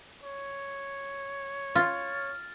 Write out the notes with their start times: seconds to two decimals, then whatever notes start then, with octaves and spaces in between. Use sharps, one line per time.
0.23 C#5
1.75 F4 F6 A6